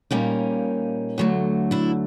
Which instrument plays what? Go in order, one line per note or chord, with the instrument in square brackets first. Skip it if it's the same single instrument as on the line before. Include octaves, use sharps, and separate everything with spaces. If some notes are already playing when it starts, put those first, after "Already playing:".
[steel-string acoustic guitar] A#2 G3 A#3 C#4 D#4
D2 D3 F#3 A3
D4 E4